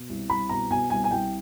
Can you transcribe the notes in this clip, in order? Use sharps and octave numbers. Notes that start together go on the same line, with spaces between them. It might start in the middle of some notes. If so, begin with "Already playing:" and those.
Already playing: B2
C2
C2 B5
B2 A#5
B2 G#5
C2 G#5
G#5
C2 G5